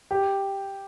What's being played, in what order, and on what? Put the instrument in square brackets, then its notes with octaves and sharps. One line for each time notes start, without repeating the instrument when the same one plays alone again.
[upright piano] G4